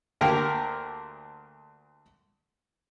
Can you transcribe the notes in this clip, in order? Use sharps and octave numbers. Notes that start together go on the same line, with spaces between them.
D2 A#3 G4 A#4 A#5